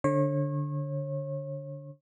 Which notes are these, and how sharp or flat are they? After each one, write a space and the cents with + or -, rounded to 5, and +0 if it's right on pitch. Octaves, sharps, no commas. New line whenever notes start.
D3 -5 C#5 -35